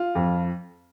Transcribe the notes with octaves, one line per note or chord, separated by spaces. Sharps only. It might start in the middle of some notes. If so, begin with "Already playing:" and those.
Already playing: F4
F2